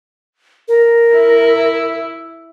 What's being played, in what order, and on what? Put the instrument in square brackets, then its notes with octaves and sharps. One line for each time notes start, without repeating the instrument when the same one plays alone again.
[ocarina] A#4
[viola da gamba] E4